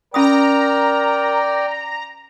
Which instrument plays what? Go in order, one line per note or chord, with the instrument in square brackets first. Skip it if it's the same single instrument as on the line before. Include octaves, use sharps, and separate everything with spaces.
[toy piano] C#4 B5 D#6 [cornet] A#4 [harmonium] D5 G5 [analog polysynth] A#5